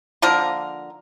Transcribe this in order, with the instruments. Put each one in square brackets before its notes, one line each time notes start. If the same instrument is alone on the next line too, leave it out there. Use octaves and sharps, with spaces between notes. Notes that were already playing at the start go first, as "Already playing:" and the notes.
[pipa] D3 F3 A#3 A#4